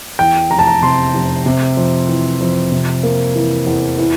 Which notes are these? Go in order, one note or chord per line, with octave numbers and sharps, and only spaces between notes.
E2 G5
F1 A#5
A5
A#5
C3 C6
F1
C3
F2
E3
F2
C3
A#3
E3
E2
E3